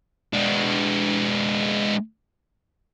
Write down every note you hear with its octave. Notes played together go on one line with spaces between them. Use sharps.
G#3 D4